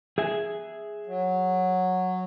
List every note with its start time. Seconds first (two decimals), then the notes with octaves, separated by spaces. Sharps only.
0.18 G#4 E5 G#5
1.06 F#3